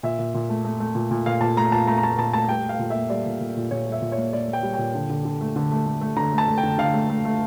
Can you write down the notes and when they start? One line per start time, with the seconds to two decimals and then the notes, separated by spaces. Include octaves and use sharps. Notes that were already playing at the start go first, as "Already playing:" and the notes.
0.03 A#2 E5
0.19 A#2
0.34 A#2
0.49 A3
0.65 A3
0.80 A3
0.95 A#2
1.11 A#2
1.26 A#2 F5
1.41 A#2 A5
1.57 A3 A#5
1.72 A#2 A5
1.87 A3 A#5
1.98 A#5
2.03 A3 A5
2.17 A#2 A5
2.33 A3 A5
2.48 G3 G5
2.64 G3
2.69 F5
2.79 A#2
2.90 A#3 E5
3.10 G3 D5
3.26 A#2
3.40 A#2
3.57 A#2
3.71 A#2 C#5
3.87 G3
3.92 E5
4.02 A#2
4.12 C#5
4.17 A#3
4.33 A#3 D5
4.48 A#3
4.53 G5
4.63 G3
4.74 A#2 G5
4.95 D3
5.10 D3
5.25 D3
5.41 A3
5.56 D3
5.71 A3
5.86 A3
6.01 A3
6.16 D3 A#5
6.33 A3
6.38 A5
6.48 A3
6.58 G5
6.63 D3
6.78 D3 F5
6.94 A3
7.10 A3
7.25 A3